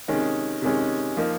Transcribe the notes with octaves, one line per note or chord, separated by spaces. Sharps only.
C3 D#3 G#3 C#4
C3 D#3 G#3 C#4
F3 A#3 D#4